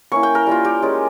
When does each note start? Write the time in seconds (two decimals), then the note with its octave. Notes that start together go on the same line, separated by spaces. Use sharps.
0.12 A#3 C#4 E4 C#6
0.23 G5
0.35 A#4
0.47 G3 A#3 F4
0.64 G4
0.82 G#3 C#4 F4